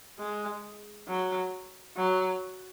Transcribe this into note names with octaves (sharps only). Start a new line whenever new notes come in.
G#3
F#3
F#3